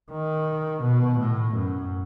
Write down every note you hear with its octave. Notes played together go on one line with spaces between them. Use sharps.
D#3
B2
A2
F#2